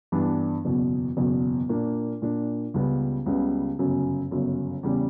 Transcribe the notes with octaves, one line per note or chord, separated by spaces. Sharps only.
G2 E3 B3 D4
F#1 E2 B2
F#1 E2 B2
A#2 A#3 D4
A#2 A#3 D4
C#2 C#3 G3 B3
C#2 C#3 G3 B3
G1 F#2 C#3
G1 F#2 C#3
E2 C#3 G3